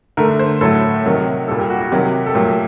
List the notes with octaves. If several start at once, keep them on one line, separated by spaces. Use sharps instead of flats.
D3 A3 A#4
C5
A2 F#3 A3 A4
C3 D#3 F#3
A#2 G3 A4
G4
F#4
F#4
C3 D#3 F#3 G4
A4
A#2 F#3 A3 G4